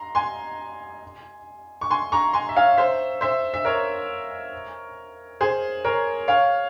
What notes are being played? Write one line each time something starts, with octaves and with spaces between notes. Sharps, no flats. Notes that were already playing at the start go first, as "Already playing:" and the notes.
Already playing: A#5 C6
G#5 C6
C#6
G#5 C6
A#5 C#6
G#5 C6
E5
C#5 F5
C5 E5
C5 E5
E5
A#4 C#5
G#4 C5
A#4 C#5
C#5 F5